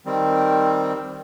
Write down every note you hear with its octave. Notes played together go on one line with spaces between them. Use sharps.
D#3 G3 C4